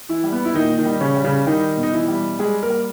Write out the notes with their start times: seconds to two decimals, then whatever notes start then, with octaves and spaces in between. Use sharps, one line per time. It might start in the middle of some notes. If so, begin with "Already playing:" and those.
0.09 E3 E4
0.24 G3
0.32 B3
0.45 E4
0.54 A#2 D#3 D#4
0.78 D#3 D#4
0.85 G3
1.00 C#3 C#4
1.16 G3
1.24 C#3 C#4
1.47 D#3 G3 D#4
1.77 B2
1.83 D#4
1.93 E3 E4
2.08 G3
2.39 G3 G#3 G#4
2.63 A#3 A#4
2.70 G3